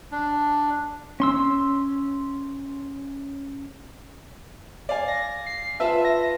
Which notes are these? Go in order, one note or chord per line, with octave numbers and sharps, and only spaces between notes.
D4
C#4 C6 E6
D5 F5 G#5
A#6
C7
F4 B4 E5 A5
A#6